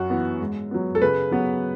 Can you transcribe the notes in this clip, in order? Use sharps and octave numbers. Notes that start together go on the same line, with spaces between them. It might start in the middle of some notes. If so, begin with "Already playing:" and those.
Already playing: F#2 F#4
E3 B3
G#2
F#3 B3
A4
C#3 B4
F#3 B3